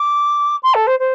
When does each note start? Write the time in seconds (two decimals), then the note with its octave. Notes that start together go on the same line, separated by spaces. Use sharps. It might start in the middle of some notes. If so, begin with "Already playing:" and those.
Already playing: D6
0.63 C6
0.74 A4
0.86 C5
0.99 C5